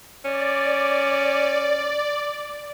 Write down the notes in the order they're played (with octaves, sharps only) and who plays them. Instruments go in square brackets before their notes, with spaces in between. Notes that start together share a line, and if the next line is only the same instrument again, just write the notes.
[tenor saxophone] C#4 [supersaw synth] D5